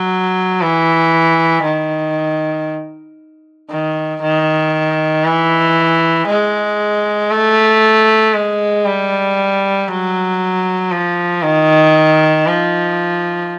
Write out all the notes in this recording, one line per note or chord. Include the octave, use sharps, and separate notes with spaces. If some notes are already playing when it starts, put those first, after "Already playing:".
Already playing: F#3
E3
D#3
D#3
D#3
E3
G#3
A3
G#3
G3
F#3
F3
D#3
F3